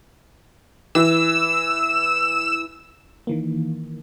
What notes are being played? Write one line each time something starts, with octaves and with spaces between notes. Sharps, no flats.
E3 E6
D#3 E3 A#3